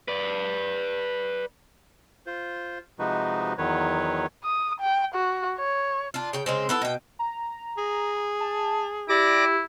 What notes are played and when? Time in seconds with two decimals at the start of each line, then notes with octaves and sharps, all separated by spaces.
0.08 B4 D5
2.26 F4 C5
2.99 C3 F3 G#3 D#4 F#4 B4
3.58 E2 D#3 F#3 B4 C#5
4.43 D#6
4.80 G5
5.14 F#4
5.58 C#5
6.14 D4 F4
6.33 C#3 G5
6.46 C#3 G#3 C4
6.69 B3 E4 A4
6.82 B2 G5
7.19 A#5
7.78 G#4
8.40 A5
9.09 E4 G4 D5 D6 A#6